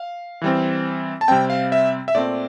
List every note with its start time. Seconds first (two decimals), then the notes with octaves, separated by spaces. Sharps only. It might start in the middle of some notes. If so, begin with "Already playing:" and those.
Already playing: F5
0.42 E3 G3 C4
1.21 A5
1.28 C3 G3 C4 G5
1.50 F5
1.72 E5
2.08 E5
2.15 A#2 A3 C4 D5